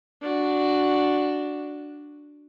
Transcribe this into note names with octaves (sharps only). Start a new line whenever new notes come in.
D4 F#4